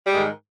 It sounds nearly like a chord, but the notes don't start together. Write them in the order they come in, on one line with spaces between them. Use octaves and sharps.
G3 G#3 G#2 D#3